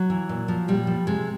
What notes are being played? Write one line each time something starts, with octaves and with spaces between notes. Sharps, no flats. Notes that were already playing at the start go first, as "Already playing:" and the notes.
Already playing: F#3
E3
A#2
F3
A#2 G3
F3
C3 G#3